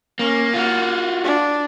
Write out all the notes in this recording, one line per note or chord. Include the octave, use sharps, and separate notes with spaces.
A#3 C#4
A#3 F4 F#4
D4